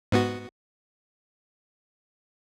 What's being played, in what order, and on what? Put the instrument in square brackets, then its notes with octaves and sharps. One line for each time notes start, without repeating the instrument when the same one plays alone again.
[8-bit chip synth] G#2 B3 F#4